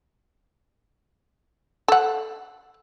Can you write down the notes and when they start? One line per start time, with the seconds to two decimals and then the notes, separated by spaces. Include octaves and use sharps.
1.88 A4 F#5